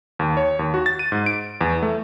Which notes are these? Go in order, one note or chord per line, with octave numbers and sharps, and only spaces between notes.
D#2
C#5
D#2
F#4
A6
D#7
G#2
D7
E2
A3